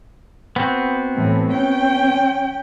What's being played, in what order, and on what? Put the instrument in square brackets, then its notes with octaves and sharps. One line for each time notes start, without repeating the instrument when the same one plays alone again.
[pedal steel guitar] B3 C4 F#4
[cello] A2 E3
C#4 G5